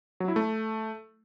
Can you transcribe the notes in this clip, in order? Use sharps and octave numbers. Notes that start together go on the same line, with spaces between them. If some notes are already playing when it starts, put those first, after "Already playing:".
F#3
E4
A3